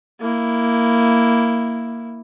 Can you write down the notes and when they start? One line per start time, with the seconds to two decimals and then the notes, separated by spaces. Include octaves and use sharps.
0.20 A#3 E4